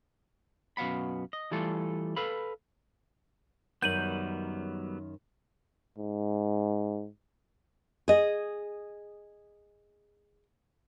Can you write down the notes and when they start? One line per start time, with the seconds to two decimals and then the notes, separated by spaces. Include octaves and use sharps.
0.77 F#2 B2 F5 F#5 B5
1.33 D#5
1.51 E3 G3 A3 F4 A4
2.16 A4 B4 F5 B5
3.82 F#2 D#3 F#3 G3 B3 G6 D#7 F#7
5.98 G#2
8.08 G#4 D#5